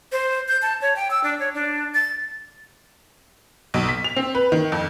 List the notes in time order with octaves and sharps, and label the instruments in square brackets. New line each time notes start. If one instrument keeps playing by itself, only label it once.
[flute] C5
G6
A5
C#5
G5
E6
D4
C#5
D4
A6
[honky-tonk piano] B1
B6
F7
C4
B4
D#3
F2